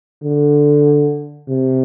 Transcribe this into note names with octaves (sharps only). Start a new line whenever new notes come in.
D3
C3